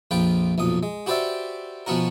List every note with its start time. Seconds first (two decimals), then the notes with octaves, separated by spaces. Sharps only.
0.11 A#1 F2 F4 B4 G5
0.58 B1 F2 A#2 D#6
0.83 G#3
1.06 F#4 G4 B4 C5 D5 E5
1.86 B2 F3 B3 C#4 F#4 A#4